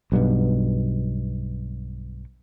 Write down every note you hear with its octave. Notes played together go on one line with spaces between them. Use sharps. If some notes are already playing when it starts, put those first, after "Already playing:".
B1 G2 B2